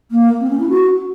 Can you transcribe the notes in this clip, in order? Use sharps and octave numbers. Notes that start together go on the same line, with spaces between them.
A#3
C4
C#4
E4
F#4